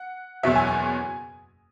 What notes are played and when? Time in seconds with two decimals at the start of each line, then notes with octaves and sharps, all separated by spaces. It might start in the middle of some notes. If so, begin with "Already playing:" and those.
Already playing: F#5
0.43 F#1 E2 B2 F#3 E5
0.56 G#5
0.67 G#5